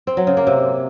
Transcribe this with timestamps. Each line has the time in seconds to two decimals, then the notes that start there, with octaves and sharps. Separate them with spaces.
0.07 C4
0.17 F#3
0.27 C#3
0.37 A#3
0.47 C3